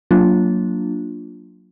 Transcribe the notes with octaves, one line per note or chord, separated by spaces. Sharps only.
F#3 A#3 D4 F4